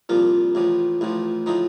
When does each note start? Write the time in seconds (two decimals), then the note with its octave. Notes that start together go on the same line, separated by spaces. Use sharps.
0.09 C2 A#2 F3 F4
0.55 A1 A2 F3
1.01 A1 A2 F3
1.46 A2 F3 D#4